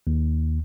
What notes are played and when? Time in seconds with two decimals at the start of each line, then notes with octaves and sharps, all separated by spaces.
0.07 D#2